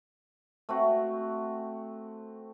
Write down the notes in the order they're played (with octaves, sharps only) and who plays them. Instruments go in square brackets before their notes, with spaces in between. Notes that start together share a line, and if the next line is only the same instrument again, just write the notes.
[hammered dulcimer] A3 C4 F#4